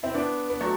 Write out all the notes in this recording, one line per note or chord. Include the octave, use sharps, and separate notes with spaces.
C4 E4
B3 D4
B3
F#3 A3